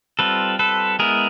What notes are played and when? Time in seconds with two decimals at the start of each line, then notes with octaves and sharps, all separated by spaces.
0.19 G3 C4 F4 A4 B4
0.59 A4 B4
0.99 G#3 B3 E4 G#4 A#4